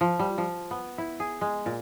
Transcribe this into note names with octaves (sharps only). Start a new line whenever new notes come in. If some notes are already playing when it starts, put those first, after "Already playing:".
F3
G3
F3
B3
E4
G#4
G#3
A#2